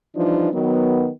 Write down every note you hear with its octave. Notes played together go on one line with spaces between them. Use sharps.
E3 F3 G3 D4 D#4
D#3 F#3 B3